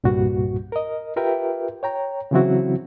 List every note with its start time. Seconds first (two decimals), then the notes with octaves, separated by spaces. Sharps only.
0.04 C2 G2 A#2 G3 F#4
0.72 A#4 D#5
1.16 F4 G4 A#4 B4 E5 G5
1.83 C#5 G5 A#5
2.31 C#3 E3 F#3 C4 E4 F#4